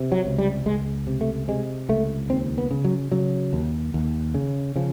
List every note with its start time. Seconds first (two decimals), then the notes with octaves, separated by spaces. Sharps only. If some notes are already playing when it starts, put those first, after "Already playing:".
Already playing: C3
0.12 F#3
0.25 C#2
0.38 G3
0.66 C#2 G#3
1.07 C3
1.21 A3
1.48 C3 G#3
1.89 C#2 A3
2.30 D#2 C4
2.58 B3
2.71 C#3
2.85 F#3
3.12 C#3 F#3
3.53 D#2
3.94 D#2
4.34 C#3
4.76 C#3 F3